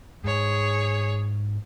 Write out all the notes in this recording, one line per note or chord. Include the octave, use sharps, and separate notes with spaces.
G#2 G#4 C#5